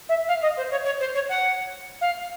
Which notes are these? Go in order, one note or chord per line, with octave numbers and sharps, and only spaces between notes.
E5
F5
D#5
C5
C#5
C#5
C5
C#5
F#5
F5